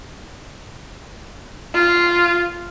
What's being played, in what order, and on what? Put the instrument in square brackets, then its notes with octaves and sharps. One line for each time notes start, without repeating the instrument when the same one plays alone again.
[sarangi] F4